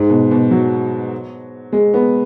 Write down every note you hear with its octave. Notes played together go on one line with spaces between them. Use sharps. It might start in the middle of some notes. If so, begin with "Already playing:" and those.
Already playing: G#2
B2
B2
F#3
G#3
B3